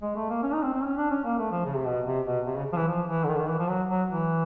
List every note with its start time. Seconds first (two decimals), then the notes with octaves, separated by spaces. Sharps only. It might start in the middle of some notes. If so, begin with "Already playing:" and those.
0.02 G#3
0.16 A3
0.29 A#3
0.43 C#4
0.53 D#4
0.63 C4
0.73 C4
0.83 C#4
0.97 D4
1.10 C#4
1.24 A#3
1.38 A3
1.51 F3
1.65 C#3
1.75 C3
1.86 B2
2.06 C3
2.26 B2
2.46 C3
2.56 C#3
2.73 F3
2.77 E3
2.87 F3
3.08 E3
3.24 D3
3.28 D#3
3.34 D3
3.39 D#3
3.48 E3
3.59 F3
3.68 F#3
3.89 F#3
4.09 E3